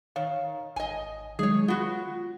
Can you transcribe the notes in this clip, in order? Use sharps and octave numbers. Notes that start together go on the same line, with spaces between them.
D#3 C#5 F5
G#1 D#5 G#5
D#3 F#3 G#3 G#4 C#5
B3 F4 F#4